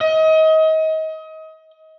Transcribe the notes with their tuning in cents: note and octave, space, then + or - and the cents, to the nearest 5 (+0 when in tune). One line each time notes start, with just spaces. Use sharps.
D#5 +30